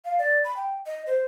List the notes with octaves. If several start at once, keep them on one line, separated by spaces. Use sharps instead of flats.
F5
D5
B5
G5
D#5
C5